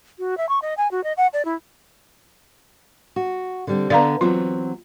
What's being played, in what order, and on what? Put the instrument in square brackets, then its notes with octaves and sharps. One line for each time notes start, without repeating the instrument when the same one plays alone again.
[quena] F#4
E5
C#6
D#5
G#5
F#4
D#5
F#5
D5
E4
[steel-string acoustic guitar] F#4
D3 G3 C4
[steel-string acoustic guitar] D3 B3 [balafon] D5 F5 A#5
[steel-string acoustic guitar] E3 F#3 C4 [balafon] F4